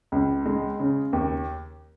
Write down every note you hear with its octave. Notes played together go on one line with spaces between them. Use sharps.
C#2
G#3
C#3
D#2